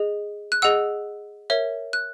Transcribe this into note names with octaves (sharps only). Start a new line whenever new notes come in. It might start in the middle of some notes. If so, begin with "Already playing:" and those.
Already playing: G#4 D#5
F#6
G#4 D#5 F#5 E6
A#4 C#5 E5
F#6